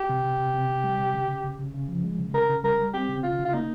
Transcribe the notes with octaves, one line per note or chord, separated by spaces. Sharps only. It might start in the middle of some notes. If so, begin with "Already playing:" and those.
Already playing: G4
C3
C3
C3
C3
C3
G3
C3
C#3
C#3
C#3
C#3
C#3
F3
G#3
C#3
C#3 A#4
C#3
G3 A#4
G3
C4 G4
C#3
C#3 F4
C#3
F4
A#3 D#4